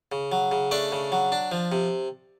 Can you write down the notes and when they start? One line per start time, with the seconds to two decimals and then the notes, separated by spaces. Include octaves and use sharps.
0.12 C#3
0.32 F#3
0.51 C#3
0.71 A3 D4 D5
0.92 C#3
1.12 F#3
1.32 D4
1.52 F3
1.72 C3